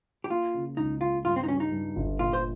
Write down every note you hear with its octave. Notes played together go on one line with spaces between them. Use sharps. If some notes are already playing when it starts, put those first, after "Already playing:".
G4
A#3 F4
C#3
C#2 D#4
C#3 F4
G2 F4
C4
D#4
G3 C#4
D#4
G2
G1
A#2 F4
C5